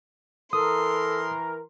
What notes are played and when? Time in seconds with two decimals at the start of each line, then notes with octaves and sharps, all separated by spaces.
0.53 E3 A4 A#4 C6 D#6